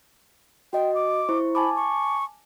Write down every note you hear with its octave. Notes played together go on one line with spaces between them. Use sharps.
F#4 D#5 G5
D6
E4 C5 C#6
G#5 A5 B5 D6
C#6